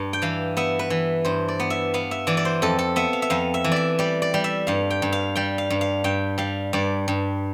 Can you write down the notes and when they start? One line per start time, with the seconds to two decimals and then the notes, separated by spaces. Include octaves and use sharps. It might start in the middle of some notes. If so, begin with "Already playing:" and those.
Already playing: G2
0.13 G5
0.22 E3 F5
0.57 B3 E5
0.79 B4
0.90 E3
1.25 G2 C5
1.49 D5
1.60 B3
1.70 E5
1.94 B3 F5
2.11 E5
2.27 E3 D5
2.37 D5
2.45 C5
2.62 F2 A4
2.79 A4
2.96 B3 E5
3.13 F5
3.22 E5
3.30 F2 F5
3.54 E5
3.64 E3
3.72 D5 E5
3.99 G3 D5
4.22 D5
4.34 G3
4.44 E5
4.67 G2 F5
4.90 G5
5.02 G2
5.13 F5
5.35 G3 G5
5.58 F5
5.70 G2
5.81 F5
6.04 G2 G5
6.38 G3 F5
6.73 G2 D5
7.08 G2